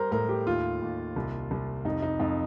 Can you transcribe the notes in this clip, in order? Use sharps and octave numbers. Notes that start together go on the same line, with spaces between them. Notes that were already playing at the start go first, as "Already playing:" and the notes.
Already playing: G3 A#4 C5
A2 A#4
G4
D#2 F4
D#2
C2
C2
F2 D#4
D#4
F2 D#4